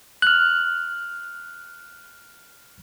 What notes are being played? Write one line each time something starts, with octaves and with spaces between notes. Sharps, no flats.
F6 F#6